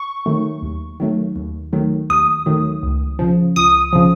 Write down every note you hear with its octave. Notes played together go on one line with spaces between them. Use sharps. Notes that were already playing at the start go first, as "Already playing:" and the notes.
Already playing: C#6
D#3 F#3 A3
D#2
D#3 F#3 A3
D#2
D#3 F#3 A3
D#2 D#6
D#3 F#3 A3
C#2
C#3 F3
C#2 D#6
C#3 F3